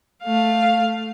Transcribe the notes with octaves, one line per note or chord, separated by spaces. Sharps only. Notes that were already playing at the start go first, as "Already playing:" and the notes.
A3 F5